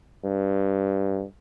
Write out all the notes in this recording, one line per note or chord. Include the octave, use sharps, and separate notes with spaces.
G2